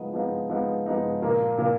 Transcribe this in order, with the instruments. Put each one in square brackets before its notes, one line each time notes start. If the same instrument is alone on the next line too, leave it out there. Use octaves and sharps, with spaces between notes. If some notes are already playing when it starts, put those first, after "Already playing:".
Already playing: [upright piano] F3 G#3 B3 D#4
F3 G#3 B3 D#4
F3 G#3 B3 D#4
F3 G#3 B3 D#4
A#2 F3 A#3
A#2 F3 A#3